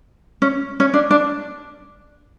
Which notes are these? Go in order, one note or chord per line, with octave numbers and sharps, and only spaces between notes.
C#4
C#4
D4
D4